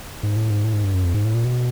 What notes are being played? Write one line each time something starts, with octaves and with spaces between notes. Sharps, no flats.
G#2
A2
G#2
A2
G#2
G2
F#2
F2
G#2
A2
A#2
B2